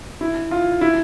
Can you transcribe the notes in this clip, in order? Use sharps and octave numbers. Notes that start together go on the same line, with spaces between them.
E4
F4
E4